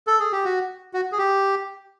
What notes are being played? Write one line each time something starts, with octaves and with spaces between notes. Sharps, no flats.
A4
G#4
G4
F#4
F#4
G#4
G4